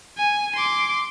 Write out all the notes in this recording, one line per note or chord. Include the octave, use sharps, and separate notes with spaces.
G#5
C6 D6